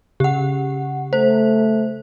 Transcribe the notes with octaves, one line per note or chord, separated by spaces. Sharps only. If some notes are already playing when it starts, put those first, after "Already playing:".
C#3 G4 F#5
A3 C5